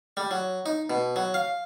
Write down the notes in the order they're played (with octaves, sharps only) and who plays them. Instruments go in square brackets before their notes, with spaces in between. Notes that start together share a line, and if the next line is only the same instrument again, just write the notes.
[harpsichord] G3
F#3
D#4
B2
F#3
F5